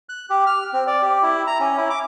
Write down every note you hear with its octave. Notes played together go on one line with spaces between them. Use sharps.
F#6
G4
F6
C4
D5
G4
E4
A#5
C#4
E4
D6